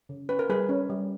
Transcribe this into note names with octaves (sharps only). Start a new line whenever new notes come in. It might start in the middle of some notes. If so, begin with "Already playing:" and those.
C#3
C#4 B4
A#4
G3 G#4 B4
C#4
G3